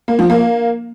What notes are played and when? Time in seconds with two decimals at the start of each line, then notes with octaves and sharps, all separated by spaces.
0.08 A#3
0.19 F3
0.30 A#3